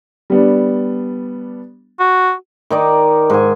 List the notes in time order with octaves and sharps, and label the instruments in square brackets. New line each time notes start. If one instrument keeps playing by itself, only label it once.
[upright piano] G3 B3 D4
[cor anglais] F#4
[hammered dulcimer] D#3 D#4 D5
G#2 G#5